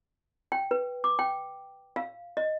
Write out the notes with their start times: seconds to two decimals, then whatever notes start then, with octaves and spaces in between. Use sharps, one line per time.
0.52 G5
0.71 B4
1.04 D6
1.19 G5
1.96 F5
2.37 D#5